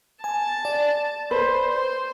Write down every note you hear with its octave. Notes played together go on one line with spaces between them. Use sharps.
G#5 A5
D5
B4 C5
C5